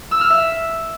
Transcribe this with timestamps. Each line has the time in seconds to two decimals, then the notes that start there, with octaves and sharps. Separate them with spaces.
0.11 E6
0.21 F6
0.30 E5